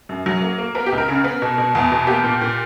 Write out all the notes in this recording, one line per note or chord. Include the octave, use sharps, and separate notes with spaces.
F#2
F#3
A#3
A#3
B3 A#4
G4
C#2
A#4
C#3
B3
B2
B2
E2
B2
A#3 G4
A#2
A#2